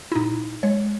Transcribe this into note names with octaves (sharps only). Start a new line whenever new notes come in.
E4
A#2 D#4
G#3 C#5